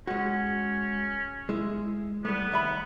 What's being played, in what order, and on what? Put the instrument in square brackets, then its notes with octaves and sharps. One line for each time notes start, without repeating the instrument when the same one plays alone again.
[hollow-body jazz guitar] G#3 F#4 [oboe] C#4
[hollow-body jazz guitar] G#3 E4
[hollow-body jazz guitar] G3 A3 [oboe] B3
[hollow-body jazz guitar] D#2 E5 B5